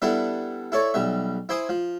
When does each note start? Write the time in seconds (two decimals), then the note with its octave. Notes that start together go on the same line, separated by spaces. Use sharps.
0.02 G3 B3 D4 E4 A4
0.72 E4 A4 C#5 D5
0.94 B1 G3 E5
1.49 E4 C5 G#5 D6 D#6
1.69 F3